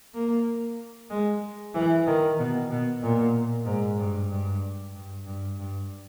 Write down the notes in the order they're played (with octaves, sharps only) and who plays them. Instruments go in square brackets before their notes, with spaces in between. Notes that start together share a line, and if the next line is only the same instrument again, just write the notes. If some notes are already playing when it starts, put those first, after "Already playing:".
[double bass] A#3
G#3
E3
D#3
B2
B2
A#2
G#2
G2
G2
G2
G2
G2